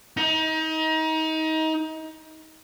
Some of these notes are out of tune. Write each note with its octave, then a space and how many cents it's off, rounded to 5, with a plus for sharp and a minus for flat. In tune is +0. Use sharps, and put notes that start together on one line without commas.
D#4 +30